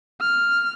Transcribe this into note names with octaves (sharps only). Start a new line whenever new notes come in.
F6